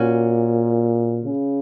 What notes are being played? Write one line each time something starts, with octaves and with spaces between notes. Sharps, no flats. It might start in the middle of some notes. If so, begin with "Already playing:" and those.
Already playing: A#2 C#4 F#4
C#3